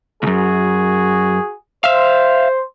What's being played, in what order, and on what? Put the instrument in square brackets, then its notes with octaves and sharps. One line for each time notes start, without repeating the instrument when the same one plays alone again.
[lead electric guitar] C#2 F#2 [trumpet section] F#4 G#4
[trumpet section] C5 [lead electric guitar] E5 F5